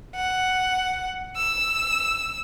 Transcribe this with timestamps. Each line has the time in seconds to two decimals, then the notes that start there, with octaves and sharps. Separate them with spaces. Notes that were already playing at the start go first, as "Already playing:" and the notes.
0.15 F#5
1.36 E6